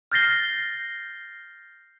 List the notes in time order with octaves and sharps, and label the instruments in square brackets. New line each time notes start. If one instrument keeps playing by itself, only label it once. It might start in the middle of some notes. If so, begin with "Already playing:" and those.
[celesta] F6 G6 A6 A#6 C7 G7